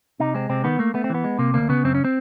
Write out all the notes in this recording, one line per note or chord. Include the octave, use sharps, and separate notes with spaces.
C3 D#4
G#3 C4
C3 C4
D#3 B3
A3 A#3
A3 B3
C4
E3 B3
G#3
C3 A#3
D2 A#3
C#3 B3
F#2 C4
C#4
C4